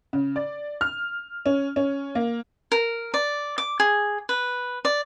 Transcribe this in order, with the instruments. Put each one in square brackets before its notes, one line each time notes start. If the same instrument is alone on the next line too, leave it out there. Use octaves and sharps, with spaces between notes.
[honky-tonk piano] C#3
D5
F6
C#4
C#4
A#3
[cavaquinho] A#4
D5
D6
G#4
B4
D5